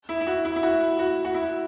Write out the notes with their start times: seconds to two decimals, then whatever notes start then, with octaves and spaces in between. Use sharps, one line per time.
0.09 E4
0.21 E4
0.27 F#4
0.45 E4
0.56 E4
0.63 F#4
0.99 F#4
1.25 F#4
1.35 E4